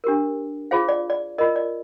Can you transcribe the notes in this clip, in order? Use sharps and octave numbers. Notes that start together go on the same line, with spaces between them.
D4 G4 A#4
F4 G#4 C5 F5
D5
D5
F4 A#4 D#5
D5